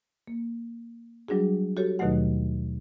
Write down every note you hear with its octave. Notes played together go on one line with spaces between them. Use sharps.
A#3
F#3 G3 D4 F#4 G#4
F#4 G4 A4 C#5
D#2 B2 D#3 F#3 A3 F#5